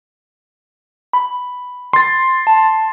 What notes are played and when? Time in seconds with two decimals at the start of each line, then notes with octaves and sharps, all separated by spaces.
1.13 B5
1.93 C6 A6
2.47 A5